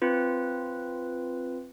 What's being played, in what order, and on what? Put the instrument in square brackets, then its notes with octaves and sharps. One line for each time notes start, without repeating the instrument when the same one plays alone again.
[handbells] C4 F4 B4